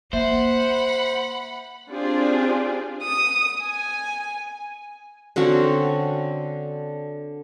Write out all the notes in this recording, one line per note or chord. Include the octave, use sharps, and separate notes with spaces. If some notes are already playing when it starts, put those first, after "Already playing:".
A#3 C5 E5 F#5 B5
C4 D4 F4 G4 G#4 D5
D#6
G#5
D3 C4 C#4 F#4